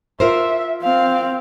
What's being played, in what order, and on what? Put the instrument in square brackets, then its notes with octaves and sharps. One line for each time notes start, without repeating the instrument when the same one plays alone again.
[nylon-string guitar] F4 A#4 C5 [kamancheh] E5
[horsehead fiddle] C4 [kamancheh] F5